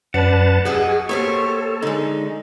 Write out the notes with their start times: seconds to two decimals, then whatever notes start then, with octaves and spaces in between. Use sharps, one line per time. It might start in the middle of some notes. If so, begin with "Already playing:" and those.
0.14 F#2 B4 D5 F#5 A5
0.65 G3 F#4 G#4 D#5
1.09 A#3 G4 A4 C5 C#5
1.82 D3 G#3 D#4